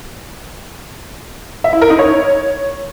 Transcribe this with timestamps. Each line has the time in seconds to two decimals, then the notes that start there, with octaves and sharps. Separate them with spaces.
1.64 E5
1.73 E4
1.82 A#4
1.90 D#4
1.99 C#5